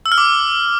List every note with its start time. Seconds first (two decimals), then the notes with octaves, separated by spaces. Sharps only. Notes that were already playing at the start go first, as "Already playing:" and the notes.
0.06 E6
0.12 F6
0.18 D6